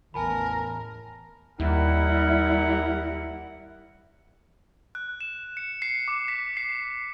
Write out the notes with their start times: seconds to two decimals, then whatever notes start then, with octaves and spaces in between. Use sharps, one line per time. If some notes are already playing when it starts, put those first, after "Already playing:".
0.14 A1 E2 E3 A#4 G#5 A5 B5
1.60 D#2 G3 E4 A#4 F#5
4.95 F#6
5.21 E7
5.57 C#7
5.82 C7
6.08 D6
6.28 B6
6.57 C7